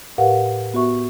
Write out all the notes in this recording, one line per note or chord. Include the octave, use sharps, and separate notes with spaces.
A2 G4 A#4 B4 F5 F#5
B3 F#4 E5 C#6